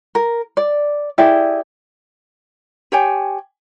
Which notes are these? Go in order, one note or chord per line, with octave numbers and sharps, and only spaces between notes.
A#4
D5
E4 G4 G#4 D5
G4 C#5 G5 G#5